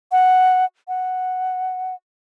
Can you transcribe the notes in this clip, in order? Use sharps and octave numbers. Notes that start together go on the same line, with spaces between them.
F#5
F#5